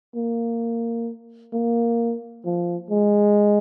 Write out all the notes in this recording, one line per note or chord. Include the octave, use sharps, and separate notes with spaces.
A#3
A#3
F3
G#3